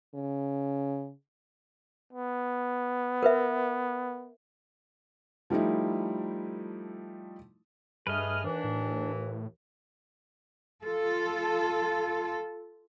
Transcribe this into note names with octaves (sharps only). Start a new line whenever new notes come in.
C#3
B3
A#4 B4 E5
F3 G3 A3 D#4 E4
G2 A3 G#4 B4 D#5 F6
D#2 E3 D4
A2
F4 A4